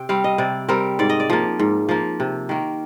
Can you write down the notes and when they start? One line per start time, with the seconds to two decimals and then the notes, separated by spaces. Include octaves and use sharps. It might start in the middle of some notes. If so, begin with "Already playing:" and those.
Already playing: C3 G5
0.09 G3 C4 F5
0.24 D#5
0.38 C3 D5
0.69 G3 C4 A#4
0.99 G#2 D5
1.10 D#5
1.20 D5
1.30 F3 A#3
1.59 G#2
1.89 F3 A#3
2.20 C3
2.49 D#3 A#3